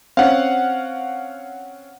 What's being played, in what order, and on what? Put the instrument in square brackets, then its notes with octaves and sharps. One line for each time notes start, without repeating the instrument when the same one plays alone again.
[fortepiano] C4 C#4 [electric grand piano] F5 F#5